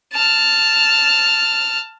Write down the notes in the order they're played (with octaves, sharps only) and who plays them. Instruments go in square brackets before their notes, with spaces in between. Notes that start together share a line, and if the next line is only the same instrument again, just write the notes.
[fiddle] A5 F6